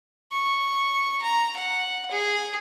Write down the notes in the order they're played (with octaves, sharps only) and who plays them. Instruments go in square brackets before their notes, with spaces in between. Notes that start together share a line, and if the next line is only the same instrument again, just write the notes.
[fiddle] C#6
A#5
F#5
G#4